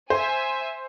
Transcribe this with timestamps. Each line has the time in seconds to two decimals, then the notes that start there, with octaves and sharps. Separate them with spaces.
0.10 C5 E5 G#5